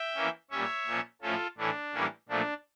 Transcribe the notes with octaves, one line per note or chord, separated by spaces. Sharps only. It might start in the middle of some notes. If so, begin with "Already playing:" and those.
Already playing: E5 G5
E3 A#3 C#4
A#2 G3 C#4 C#5 E5
A#2 F3 C#4
A2 F3 A3 C#4 F4 A4
A2 E3 A3 C#4 D4
A2 E3 G3 A#3 C#4
A#2 F3 A3 D4